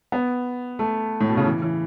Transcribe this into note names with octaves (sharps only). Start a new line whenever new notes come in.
B3
A3
A2
B2
C#3
E3
E3